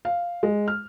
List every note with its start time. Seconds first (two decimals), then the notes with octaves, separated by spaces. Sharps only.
0.05 F5
0.43 G#3
0.68 F6